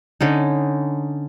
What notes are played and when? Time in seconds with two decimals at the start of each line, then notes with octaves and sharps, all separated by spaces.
0.21 D3 C#4 D#4